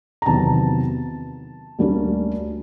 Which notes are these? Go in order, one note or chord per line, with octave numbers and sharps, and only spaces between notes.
A#5
E2 C3 D#3 F#3 B3 A5
D2 D3 G3 A#3 C#4